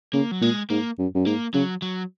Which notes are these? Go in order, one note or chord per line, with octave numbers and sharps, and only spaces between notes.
C#3 A#3
F#3
A#2 G#3
G#2 A#3
F#2
F#2
G#2 A#3
C#3 F#3
F#3